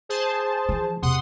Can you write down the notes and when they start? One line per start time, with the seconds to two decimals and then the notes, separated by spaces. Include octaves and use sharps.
0.09 G#4 C5 A5
0.69 E3 F3
1.02 E2 C3 F#5 C6 D#6